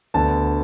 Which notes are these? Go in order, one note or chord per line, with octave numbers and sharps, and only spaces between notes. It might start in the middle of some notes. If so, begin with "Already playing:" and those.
D2 D3 B3 A5